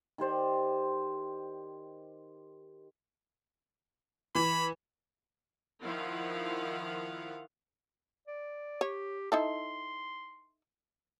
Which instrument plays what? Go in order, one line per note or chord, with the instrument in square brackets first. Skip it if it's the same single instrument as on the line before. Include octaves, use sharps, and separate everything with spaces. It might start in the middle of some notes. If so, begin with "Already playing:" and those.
[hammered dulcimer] D#3 G4 C5 D5
[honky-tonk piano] E3 [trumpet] B5
[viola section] D#3 F3 E4 F5 F#5
[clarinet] D5
[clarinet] G4 [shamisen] C#5
[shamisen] D#4 E4 A4 [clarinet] C6